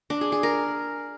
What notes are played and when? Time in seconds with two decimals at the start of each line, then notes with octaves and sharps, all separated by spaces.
0.10 D4
0.21 G#4
0.32 G#4
0.43 A#4